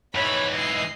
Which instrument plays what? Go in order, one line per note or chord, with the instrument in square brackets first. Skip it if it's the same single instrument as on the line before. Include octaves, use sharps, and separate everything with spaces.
[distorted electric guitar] G#2 E3 [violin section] C#5 B5
[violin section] D#5 C7